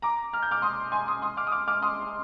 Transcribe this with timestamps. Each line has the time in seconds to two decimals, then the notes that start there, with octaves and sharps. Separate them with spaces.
0.02 A#5 D6
0.33 F6
0.42 G6
0.51 D6 F6
0.62 C6 D#6
0.92 G#5 C6
1.07 C6 D#6
1.22 C6 D#6
1.37 D6 F6
1.47 D#6
1.52 D6 F6
1.68 D6 F6
1.82 C6 D#6